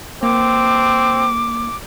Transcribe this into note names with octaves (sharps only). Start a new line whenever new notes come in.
A#3 C4 D6